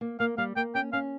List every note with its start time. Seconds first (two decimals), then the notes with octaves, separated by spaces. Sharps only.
0.01 A#3
0.20 A#3 F5
0.38 G3 F5
0.56 A#3 G5
0.75 C#4 G5
0.93 C#4 F5